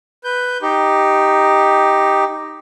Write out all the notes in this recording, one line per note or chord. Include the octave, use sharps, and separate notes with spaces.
B4 G6
D#4 G4